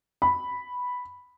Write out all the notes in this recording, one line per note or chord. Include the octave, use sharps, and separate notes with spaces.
B5